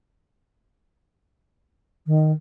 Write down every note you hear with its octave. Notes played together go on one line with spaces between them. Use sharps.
D#3